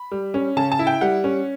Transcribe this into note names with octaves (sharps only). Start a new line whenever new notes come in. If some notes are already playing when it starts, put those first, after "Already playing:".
Already playing: B5
G3
C#4
C#3 A5
A5
E4
G5
G3 F#5
C#4